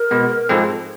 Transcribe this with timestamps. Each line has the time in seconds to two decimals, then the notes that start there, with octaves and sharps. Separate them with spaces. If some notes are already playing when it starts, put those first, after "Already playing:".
Already playing: A#4
0.11 B2 G#3 B3
0.49 G#2 F3 G#3 C4 A4